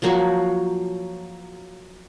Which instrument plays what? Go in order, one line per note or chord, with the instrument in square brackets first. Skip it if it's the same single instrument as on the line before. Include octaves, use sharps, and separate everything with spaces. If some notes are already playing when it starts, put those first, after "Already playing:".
[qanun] F3 F#3 A#3 F#4